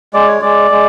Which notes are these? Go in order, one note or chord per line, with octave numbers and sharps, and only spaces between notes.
G#3 D5
C#5
G#3 D5
G#3